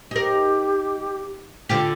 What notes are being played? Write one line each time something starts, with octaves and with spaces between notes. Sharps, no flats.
D#4 G4 A#4
D3 F4 G4